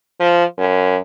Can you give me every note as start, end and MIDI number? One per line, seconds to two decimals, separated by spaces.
0.20 0.44 53
0.58 0.98 42